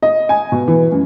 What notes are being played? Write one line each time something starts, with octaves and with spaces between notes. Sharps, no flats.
D#5
G#5
B2
E3
F#2